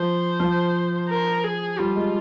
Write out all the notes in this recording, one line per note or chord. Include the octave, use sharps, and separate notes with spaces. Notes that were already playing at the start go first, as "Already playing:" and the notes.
Already playing: F3 C5
F3
A#4
G#4
G3 F4
G#3